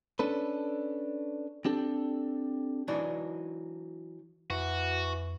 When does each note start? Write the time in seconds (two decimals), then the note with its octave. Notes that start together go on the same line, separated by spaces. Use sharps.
0.19 C#4 D4 A4 B4
1.65 C4 D4 G4 A4
2.88 E3 F#3 D4 D#4
4.50 F2 E3 F#4